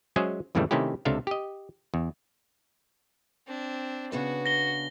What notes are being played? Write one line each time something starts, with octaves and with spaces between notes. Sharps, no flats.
F#3 G#3 C#4 G#4 C5 E5
F2 A2 C#3 E3 G3 A3
C3 D#3 A3 C#4 E4 G4
C#2 C3 D4 A4 E5 F5
G4 D#5
E2
C4 D4
C#3 B3 D4 F#4
A#6 G7